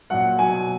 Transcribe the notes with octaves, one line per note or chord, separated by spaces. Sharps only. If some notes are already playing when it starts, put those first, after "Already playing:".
A#2 F#3 F#5
B2 F#3 G#5